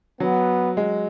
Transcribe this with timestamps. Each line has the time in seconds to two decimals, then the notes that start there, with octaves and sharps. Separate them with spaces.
0.20 F#3 B3
0.77 G#3